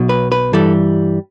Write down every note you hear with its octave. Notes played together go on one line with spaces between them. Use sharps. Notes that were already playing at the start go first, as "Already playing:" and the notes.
Already playing: B1 B2 F#3
B4
B4
G2 E3 G3 A4